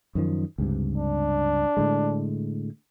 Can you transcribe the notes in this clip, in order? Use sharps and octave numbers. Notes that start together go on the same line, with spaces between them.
F#2 D#3 F3
C#2 G2 C3
D4
A2 D3 G#3